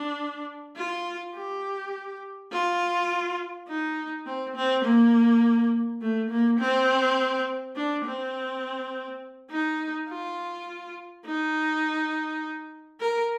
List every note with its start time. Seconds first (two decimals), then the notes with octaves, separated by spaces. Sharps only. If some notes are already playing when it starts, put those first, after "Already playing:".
Already playing: D4
0.76 F4
1.35 G4
2.52 F4
3.68 D#4
4.27 C4
4.56 C4
4.84 A#3
6.01 A3
6.30 A#3
6.59 C4
7.76 D4
8.04 C4
9.50 D#4
10.09 F4
11.26 D#4
13.00 A#4